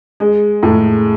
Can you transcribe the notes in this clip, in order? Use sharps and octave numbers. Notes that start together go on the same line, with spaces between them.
G#3
A2